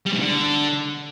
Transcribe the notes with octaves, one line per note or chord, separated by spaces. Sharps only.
G3
G#2
D3